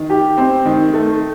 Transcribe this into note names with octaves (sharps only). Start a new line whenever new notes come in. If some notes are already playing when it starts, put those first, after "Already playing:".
Already playing: D#3
G4
C4
D#3
A3